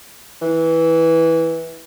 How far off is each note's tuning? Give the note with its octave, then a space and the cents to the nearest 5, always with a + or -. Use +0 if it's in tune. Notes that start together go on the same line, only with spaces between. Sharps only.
E3 -10